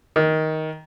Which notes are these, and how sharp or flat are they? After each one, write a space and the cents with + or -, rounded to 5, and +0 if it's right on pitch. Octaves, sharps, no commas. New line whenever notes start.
D#3 +15